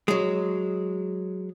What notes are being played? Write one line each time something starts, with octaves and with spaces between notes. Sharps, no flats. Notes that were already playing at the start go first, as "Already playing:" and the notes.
F#3 G#3